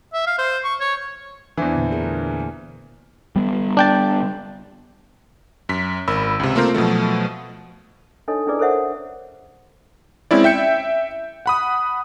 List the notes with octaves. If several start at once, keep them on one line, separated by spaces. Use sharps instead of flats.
E5
F5
C5
C#6
C#5
E2 E3 D4 C5
A#2 D3
A#3 G#4 A#4
A3
G3 B3
D4 G5 A5
F#2 B6
G#1 A#4 B5 E6
C#2 C3
A3 A#3 C4 F4 A#4 C5
B2 F3 F#3 A3
D4 D#4 A4 C#5 D#5
C#4 D4 E4 G#4 B4 D5
A4 A#4 C5 C#5 E5 F#5
G#3 C4 C#4 E4 D5
E5 G5 G6 C#7
F#5 B5 D#6